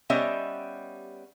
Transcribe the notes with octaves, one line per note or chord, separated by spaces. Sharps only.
G3 B3 C#4 G4 D#5 E5